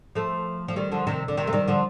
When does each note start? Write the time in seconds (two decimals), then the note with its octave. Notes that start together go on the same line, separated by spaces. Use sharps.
0.15 F3 A3
0.68 F3
0.76 D#3 G3
0.92 D3 F3
1.07 C3 D#3
1.28 D3
1.37 C3 D#3
1.47 A3
1.53 D#3 G3
1.68 D3 F3